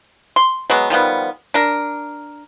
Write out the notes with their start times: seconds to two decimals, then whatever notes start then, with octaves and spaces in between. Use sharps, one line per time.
0.36 C6
0.70 F#3 G#3 B3
0.90 D#3 F3 G3 B3
1.54 D4 A#4